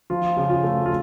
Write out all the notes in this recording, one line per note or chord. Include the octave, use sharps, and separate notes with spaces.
F3 F4
C#3
F4
A3
F4